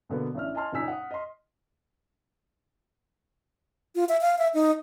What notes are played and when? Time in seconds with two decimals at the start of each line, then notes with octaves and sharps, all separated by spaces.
0.09 B2 D3 A#3 B3
0.35 A1 D4 E5 F6
0.55 D#5 G#5 A5 C6 F6
0.72 F#1 A#2 D#4 G#5 E6 B6
0.88 F#5 D#6
1.11 D#5 C6
3.95 F4
4.09 E5
4.21 F5
4.38 E5
4.54 D#4